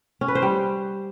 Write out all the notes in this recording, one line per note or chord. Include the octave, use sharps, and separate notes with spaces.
C#4
B4
C5
G3